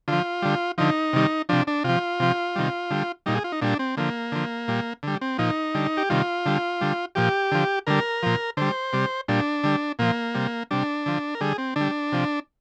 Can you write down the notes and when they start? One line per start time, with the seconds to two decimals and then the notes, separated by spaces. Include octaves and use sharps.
0.08 D3 F3 F4
0.42 D3 G3
0.78 D3 F3 D#4
1.13 C3 D#3 G3
1.49 C3 F3 D4
1.67 D4
1.84 C3 F3 F4
2.20 C3 F3
2.56 C3 D#3 G3
2.90 D3 G3
3.26 A#2 G3 D#4
3.35 G#4
3.44 F4
3.52 D#4
3.62 A#2 G3 D4
3.79 C4
3.97 D3 F3 A#3
4.32 D3 F3
4.68 A#2 G3
5.03 D3 G3
5.21 C4
5.38 A#2 F3 D#4
5.75 D3 G3
5.97 G4
6.10 C3 D#3 G3 F4
6.46 D3 G3
6.81 D3 G3
7.15 A#2 F3 G4
7.52 D3 F3
7.87 D3 G3 A#4
8.23 A#2 F3
8.57 D3 G3 C5
8.93 C3 G3
9.28 A#2 G3 D4
9.63 D3 G3
9.99 A#2 F3 A#3
10.35 C3 G3
10.71 C3 G3 D4
11.06 D3 F3
11.35 A#4
11.41 D3 G3 G#4
11.58 C4
11.76 D3 D4
11.81 G3
12.12 C3 F3